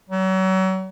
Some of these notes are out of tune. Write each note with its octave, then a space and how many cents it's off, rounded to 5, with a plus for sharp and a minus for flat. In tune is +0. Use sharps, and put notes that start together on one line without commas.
F#3 +35